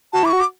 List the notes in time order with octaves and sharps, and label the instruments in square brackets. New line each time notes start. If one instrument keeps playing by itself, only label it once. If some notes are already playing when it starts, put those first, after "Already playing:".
[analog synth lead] F#4 [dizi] A5
[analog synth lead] E4 [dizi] D6
[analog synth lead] F#4 [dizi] C#6
[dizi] D6